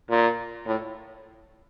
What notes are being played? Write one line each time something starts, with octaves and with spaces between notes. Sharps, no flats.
A#2
A2